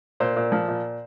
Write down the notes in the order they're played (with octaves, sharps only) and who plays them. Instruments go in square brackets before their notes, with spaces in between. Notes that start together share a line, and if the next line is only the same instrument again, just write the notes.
[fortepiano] A#2 C5
A#2
F3
A#2